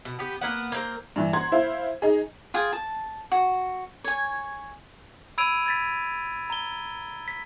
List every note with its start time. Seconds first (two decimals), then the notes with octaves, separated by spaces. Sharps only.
0.05 B2
0.19 B3 G4
0.41 A#3 B3 F#5
0.72 A#3 C4 A#4
1.16 G2 E3
1.33 F#5 A#5 C6 G#6
1.52 E4 C5 F5
2.02 D#4 G#4
2.54 F4 G#4 G5
2.73 A5
3.32 F#4
4.04 C#5 G#5
5.38 B5 E6 G#6 D7 D#7 F7
5.66 G#6 A6 B6
6.50 A#5 G7
7.28 B6